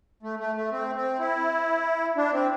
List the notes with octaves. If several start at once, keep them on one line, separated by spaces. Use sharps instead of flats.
A3
A3
A3
C4
C4
E4
D4
C4